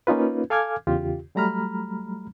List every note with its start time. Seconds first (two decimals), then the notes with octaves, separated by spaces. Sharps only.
0.07 A#3 C#4 D#4 F4 B4
0.50 A4 F5 G#5 D6 F6 G#6
0.87 E2 C#3 F4 G4
1.35 F#3 G3 A3 A#5 B5 F6